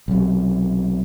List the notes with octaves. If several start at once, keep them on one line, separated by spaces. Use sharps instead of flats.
B1 C3